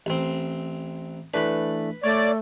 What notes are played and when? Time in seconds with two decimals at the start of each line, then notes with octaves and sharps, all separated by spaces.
0.06 A1 C4
1.34 E3 A3 D4 B4 B5
2.04 A3 C#5 D5